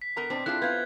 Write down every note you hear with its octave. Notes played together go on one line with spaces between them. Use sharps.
B6
B3 A#4 A#5
B2 C4 D4 D5
D4 E4 F4 G#4 A4 F#6
B3 B4 F5 G6 G#6